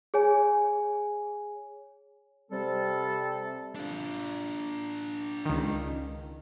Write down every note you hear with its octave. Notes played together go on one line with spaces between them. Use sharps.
G#4 C#5 G#5
C3 G3 C4 A4
D4 F4
C#2 D#3